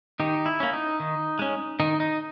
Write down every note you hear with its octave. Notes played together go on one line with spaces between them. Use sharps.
D#3 D#4 G4
E4
A#3 C#4
D#4
D#3
G#3 C#4
D#3 D#4
D#4